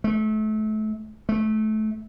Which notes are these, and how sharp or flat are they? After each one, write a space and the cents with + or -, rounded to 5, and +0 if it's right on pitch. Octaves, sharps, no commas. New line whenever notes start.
A3 -30
A3 -20